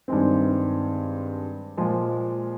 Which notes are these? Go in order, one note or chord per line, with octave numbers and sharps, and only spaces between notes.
G2 D#3 G#3 C4
A#2 F3 G#3